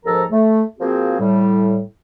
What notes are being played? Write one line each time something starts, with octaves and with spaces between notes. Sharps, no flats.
D#2 G#2 F3 A4 A#4 A#5
A3
F3 A#3 C4 F#4 G#4
A2 G3